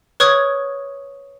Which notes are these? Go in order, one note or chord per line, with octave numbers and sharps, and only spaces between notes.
B4 C#5 C#6 D#6 F6 G#6